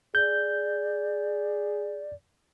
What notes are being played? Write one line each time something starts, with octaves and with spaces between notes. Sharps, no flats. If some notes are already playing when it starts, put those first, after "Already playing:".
G#4 D5 G6